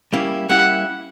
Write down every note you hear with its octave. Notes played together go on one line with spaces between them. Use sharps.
G3 A#3 C#4 E4 G4
G3 A#3 C#4 E4 G4 F#5